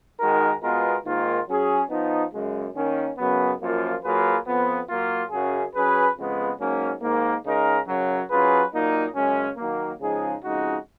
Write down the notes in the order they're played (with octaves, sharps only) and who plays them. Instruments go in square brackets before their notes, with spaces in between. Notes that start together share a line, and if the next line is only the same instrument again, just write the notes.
[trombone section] D#3 G#3 D#4 F#4 A#4
B2 G#3 B3 F4 A#4
G#2 D#3 A#3 F4
F#3 C#4 G#4
F3 B3 D#4
F#2 C#3 G#3
D#3 A#3 C#4
F#2 C#3 F#3 B3
F#2 F3 A#3 F4
F#3 A#3 F4 G#4 B4
F2 F3 B3
F#3 A#3 F4
F#2 C#3 F#3 C#4 G#4
F#3 C#4 G#4 B4
F2 C#3 G#3 B3
G#2 F#3 A#3 C#4
G#2 D#3 A#3
C#3 G#3 D#4 A#4
F#2 C#3 F#3
F#3 C#4 F4 G#4 B4
A#2 F#3 A#3 D#4
F#2 C#3 G#3 C#4
D#3 F#3 A#3
C#3 F3 G#3 D#4 G#4
F2 C#3 G#3 D#4 F#4